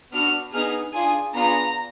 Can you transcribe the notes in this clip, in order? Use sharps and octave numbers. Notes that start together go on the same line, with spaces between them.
B3 D4 F#4 F6
B3 D#4 G#4 F6
D4 F4 G#4 G#5
B3 D4 F4 G#4 A#5